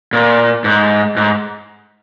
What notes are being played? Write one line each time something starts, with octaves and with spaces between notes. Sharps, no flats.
A#2
G#2
G#2